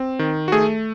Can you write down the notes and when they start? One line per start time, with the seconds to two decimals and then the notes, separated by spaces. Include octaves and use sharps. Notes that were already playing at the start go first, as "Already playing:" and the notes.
Already playing: C4
0.19 D#3
0.48 F#4
0.52 A3 G#4